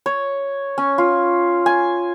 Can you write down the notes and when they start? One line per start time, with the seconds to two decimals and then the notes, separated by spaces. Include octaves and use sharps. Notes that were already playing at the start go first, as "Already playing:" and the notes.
0.06 C#5
0.78 C#4
0.98 F4
1.66 G#5